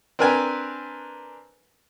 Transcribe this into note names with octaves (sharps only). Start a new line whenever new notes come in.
C4 D4 A#4 B4 G#5 A#5